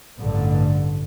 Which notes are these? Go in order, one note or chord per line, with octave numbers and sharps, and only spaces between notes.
A1 G2 D3